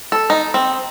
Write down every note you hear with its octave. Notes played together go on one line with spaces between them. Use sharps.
A4
D#4
C4